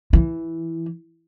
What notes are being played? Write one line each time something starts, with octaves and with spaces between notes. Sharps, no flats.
E3